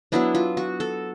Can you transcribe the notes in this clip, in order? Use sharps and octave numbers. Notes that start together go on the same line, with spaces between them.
F#3 B3 D4 E4
F4
F#4
A4